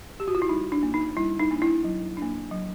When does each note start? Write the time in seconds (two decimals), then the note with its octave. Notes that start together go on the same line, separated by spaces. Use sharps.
0.20 G4
0.28 F#4
0.35 F4
0.42 E4
0.49 G3 D#4
0.72 D4
0.83 A#3 D4
0.94 D#4
1.16 G3 E4
1.39 D#4
1.51 A#3 D4
1.62 E4
1.84 F#3
2.17 A#3 D4
2.51 F#3